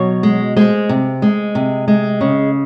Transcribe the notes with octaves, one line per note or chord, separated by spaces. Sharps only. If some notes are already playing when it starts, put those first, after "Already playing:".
Already playing: B2 F#3 C#5
G#3
G#3 C5
C3
G#3
C3
G#3
C#3